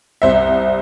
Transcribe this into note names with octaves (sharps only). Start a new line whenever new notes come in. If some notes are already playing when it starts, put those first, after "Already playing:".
C2 C5 E5